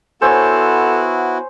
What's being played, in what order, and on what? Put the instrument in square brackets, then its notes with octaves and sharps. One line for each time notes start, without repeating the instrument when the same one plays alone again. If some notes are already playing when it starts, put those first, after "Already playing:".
[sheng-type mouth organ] B3 E4 F#4 [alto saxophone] A4 [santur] C5 C#5 E6 [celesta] G#5